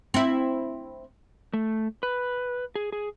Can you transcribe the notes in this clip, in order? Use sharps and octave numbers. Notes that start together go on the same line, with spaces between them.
C4 E4
A3
B4
G#4
G#4